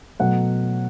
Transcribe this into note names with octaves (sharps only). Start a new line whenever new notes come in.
B2 F#3 A3 F#5